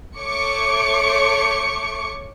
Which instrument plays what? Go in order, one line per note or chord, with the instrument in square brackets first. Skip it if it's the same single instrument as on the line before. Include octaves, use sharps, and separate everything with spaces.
[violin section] A3 C#5 C#6 D6 C#7